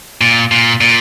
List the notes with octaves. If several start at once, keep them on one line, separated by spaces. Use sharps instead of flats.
A#2
A#2
A#2